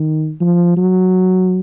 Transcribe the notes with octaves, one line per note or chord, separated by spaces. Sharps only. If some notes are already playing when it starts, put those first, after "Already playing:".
Already playing: D#3
F3
F#3